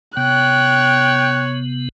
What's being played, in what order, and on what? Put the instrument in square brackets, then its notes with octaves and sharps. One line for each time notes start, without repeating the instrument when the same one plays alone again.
[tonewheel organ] C3 B3 [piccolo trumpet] C#5 [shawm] G5 [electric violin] F#6